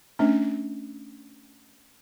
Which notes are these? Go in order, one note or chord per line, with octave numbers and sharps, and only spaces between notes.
A3 C#4 D4